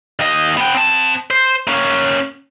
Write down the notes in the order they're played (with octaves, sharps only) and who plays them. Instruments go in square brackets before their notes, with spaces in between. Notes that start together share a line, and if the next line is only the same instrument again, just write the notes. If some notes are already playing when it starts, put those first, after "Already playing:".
[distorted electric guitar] D#2 D#5
B3 G5
C4 A5
C5
A#3 C#4